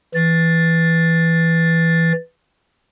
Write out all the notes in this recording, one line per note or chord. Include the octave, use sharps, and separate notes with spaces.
E3 A6